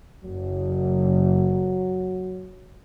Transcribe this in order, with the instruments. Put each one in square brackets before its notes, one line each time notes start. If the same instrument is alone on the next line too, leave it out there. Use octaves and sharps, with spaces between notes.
[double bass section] F#1 [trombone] F#3